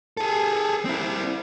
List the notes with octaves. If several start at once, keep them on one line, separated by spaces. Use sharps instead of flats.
G#4 A4
C4 E4